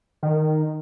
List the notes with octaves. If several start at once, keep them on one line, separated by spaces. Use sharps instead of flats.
D#3